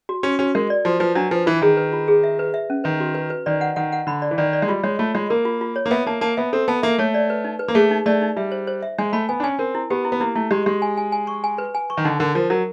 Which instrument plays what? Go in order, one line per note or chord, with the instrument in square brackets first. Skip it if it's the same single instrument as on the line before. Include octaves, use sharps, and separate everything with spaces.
[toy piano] F#4
[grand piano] C#4 [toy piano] F#4
[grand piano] C#4 [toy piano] F#4
[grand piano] G#3 [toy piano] A#4
[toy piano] D5
[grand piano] F3 [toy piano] F#4
[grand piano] F3 [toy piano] B4
[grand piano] F#3 [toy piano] D4
[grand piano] F3 [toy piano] B4
[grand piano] E3 [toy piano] F4
[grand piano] D#3 [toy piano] G#4
[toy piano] B4
F4
G#4
E5
B4
E5
C#4
[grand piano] D#3 [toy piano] B4
[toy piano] F#4
B4
B4
[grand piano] D#3 [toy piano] D5
[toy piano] F#5
[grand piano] D#3 [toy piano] F#5
[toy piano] F#5
[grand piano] D3 [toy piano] B5
[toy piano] D5
[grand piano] E3
[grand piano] D#3 [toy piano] D5
[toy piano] D5
[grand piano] G#3
[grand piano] G3 [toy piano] F4
[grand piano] G#3 [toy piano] C#5
[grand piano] A3 [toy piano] F4
[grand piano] G#3 [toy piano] F4
[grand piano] A#3 [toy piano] A#4
[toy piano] F4
F4
C#5
[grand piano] A#3
[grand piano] B3 [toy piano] E5
[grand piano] A#3 [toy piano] A5
[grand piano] A#3 [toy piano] A5
[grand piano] B3 [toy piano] E5
[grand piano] C4 [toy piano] A4
[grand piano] B3 [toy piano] A5
[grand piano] A#3 [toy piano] E5
[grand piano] A3 [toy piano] C#5
[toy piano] D5
B4
D#4
B4
[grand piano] A#3
[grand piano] A3 [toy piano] G#4
[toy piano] D#4
[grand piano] A3 [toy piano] D5
[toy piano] D#4
[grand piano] G3 [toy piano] E5
[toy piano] C5
C5
E5
[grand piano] G#3 [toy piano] G#5
[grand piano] A3 [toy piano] B5
[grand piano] B3 [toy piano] G#5
[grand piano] D4
[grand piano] C#4 [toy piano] G#5
[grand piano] C4 [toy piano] A#4
[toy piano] E4
[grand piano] B3 [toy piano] G4
[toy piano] E4
[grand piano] B3
[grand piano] A#3 [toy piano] E4
[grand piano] A3 [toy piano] E4
[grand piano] G#3 [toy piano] G4
[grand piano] G#3 [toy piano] G4
[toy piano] G#5
G#5
G#5
C#6
G#5
B4
G#5
C#6
[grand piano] D#3
[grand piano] D3 [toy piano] D#4
[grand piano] D3 [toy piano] A#4
[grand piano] F3 [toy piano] A#4
[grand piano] F#3 [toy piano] A#4